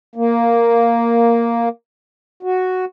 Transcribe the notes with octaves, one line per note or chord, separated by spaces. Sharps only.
A#3
F#4